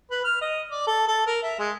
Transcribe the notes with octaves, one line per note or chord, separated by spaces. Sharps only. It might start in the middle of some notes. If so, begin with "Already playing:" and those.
B4
F6
D#5
D5
A4
A4
A#4
E5
G#3